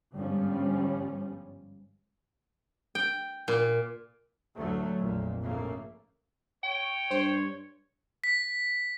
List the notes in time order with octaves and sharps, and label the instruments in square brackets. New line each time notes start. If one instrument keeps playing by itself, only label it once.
[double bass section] G1 G#2 F3 G3 C#4
[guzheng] G5
A#2
[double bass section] D2 A2 F#3 A3
A#1 F2 A#2
A#1 F2 G#2 C#3 A3 A#3
[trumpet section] C#5 [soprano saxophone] G5
[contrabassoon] G2 [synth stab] C5
[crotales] B6